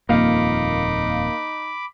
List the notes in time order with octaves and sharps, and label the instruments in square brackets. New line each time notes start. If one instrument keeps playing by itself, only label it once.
[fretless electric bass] D#1 F2 A#2 [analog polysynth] A#3 F5 [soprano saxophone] D#4 [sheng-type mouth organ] B5 D6